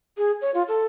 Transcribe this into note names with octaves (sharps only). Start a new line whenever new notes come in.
G#4
C#5
F4
A4